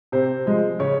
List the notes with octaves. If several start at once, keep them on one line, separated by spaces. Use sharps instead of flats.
C3 C5
F3 G#3
C#3 C#5